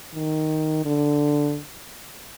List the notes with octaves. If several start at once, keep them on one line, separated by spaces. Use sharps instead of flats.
D#3
D3